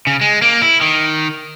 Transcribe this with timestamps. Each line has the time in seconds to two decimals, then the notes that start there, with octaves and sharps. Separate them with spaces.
0.07 C#3
0.21 G#3
0.42 A#3
0.62 E4
0.81 D#3